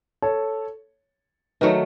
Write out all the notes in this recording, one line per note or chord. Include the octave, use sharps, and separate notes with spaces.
A4 C#5
D#3 F#3 A3 B4 D#5